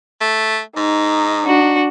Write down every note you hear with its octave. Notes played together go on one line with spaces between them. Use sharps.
A3
G#2 D#4
D4 F#4